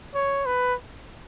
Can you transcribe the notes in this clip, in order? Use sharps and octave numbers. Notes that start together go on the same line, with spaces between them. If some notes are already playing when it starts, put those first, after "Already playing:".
C#5
B4